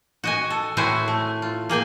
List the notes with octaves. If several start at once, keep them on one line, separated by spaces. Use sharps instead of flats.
F#4 D#5 G#5
A4
A2 C4 E4 F#4 C5 G#5
A3
F4
A#3 G#4 G5 G#5